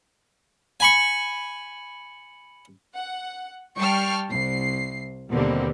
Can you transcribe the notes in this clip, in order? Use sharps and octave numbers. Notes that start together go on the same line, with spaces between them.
G#5 B5 C#6
F#5
G3 G5 A5 C#6 F6 C7
C2 C7
D#2 B2 D3 G3 A#3 C4